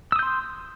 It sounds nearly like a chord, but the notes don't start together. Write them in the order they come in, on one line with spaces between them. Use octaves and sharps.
E6 D#6 G6 C6